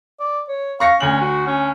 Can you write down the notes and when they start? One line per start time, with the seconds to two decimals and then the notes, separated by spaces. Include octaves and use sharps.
0.20 D5
0.48 C#5
0.80 F5 C#6 A#6 C#7
1.00 D2 C#4 F#7
1.21 F#4
1.46 C#4